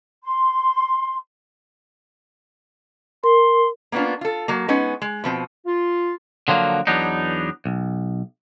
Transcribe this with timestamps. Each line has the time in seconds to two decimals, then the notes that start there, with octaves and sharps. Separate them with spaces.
0.24 C6
3.24 A#4 C6
3.92 A#3 B3 C#4 D4 F4
4.21 F4 A4
4.48 F#3 A#3
4.68 G#3 B3 C#4 D#4
5.02 G#3
5.24 B2 F3 C4
5.66 F4
6.48 D3 F3 F#3 A#3
6.87 E2 F#3 B3 D4 D#4
7.66 B1